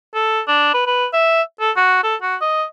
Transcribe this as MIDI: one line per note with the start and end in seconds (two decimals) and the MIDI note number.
0.15 0.41 69
0.47 0.70 62
0.74 0.82 71
0.86 1.07 71
1.13 1.42 76
1.60 1.71 69
1.76 2.01 66
2.03 2.15 69
2.22 2.36 66
2.41 2.65 75